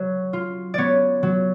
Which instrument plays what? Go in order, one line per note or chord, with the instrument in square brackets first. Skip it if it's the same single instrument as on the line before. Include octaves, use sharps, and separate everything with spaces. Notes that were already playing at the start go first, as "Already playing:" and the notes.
Already playing: [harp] F#3
F4
B3 C#5 D5
F#3